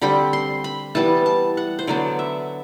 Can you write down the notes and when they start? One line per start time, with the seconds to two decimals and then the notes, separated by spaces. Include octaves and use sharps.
0.01 D3 G3 C4 B5
0.33 C6
0.64 B5
0.95 E3 G3 B3 A5
1.26 A5
1.57 F#5
1.79 C5
1.87 D3 F#3 B3 D5
2.19 E5